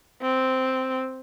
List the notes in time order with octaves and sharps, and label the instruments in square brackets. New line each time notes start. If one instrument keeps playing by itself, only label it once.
[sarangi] C4